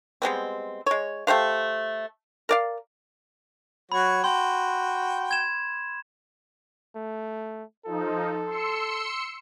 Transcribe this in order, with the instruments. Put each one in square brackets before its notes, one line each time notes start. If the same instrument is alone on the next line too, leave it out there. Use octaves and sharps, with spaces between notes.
[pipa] G3 G#3 B3 C4
G#3 C#5
A3 G4 C5 F5
A#4 D5 F5
[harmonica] F#3 F#4 C#5 [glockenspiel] B5
[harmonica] F#4 G5 [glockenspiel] C6
[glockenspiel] G#6 E7
[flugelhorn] A3
[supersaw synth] F3 D#4 [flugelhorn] A4
[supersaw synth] C6 E6 C#7